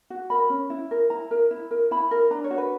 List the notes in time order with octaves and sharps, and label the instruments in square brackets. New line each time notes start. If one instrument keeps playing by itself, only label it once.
[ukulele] F#4
A#4 B5
C#4
E4
A#4
E4 A#5
A#4
E4
A#4
E4 B5
A#4
D4 A#5
C#5
F#4
B4